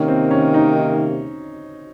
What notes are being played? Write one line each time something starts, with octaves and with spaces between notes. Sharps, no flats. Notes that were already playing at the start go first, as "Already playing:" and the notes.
Already playing: C3 D#3 A#3 C#4
C4
C#4
D#4